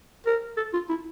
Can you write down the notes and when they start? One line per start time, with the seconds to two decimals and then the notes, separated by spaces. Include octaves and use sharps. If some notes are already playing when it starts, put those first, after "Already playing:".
0.26 A#4
0.57 A4
0.73 F4
0.89 E4